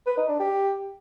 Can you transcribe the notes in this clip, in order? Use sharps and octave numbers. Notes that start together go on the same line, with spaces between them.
B4
D#4
D4
G4